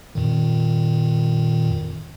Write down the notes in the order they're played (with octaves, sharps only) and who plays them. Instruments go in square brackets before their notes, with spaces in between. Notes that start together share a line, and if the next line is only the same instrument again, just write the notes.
[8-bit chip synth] F2 A#2 D#3